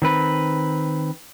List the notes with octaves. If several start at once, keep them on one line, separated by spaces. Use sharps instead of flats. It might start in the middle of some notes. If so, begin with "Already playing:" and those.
D#3 C4 B4